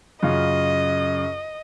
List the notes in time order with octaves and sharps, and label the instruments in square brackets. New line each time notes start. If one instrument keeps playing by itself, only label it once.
[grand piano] F#2 C#3 F4 [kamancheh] D#5